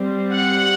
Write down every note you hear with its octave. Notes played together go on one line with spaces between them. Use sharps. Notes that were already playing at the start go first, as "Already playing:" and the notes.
Already playing: G3 C4
F#5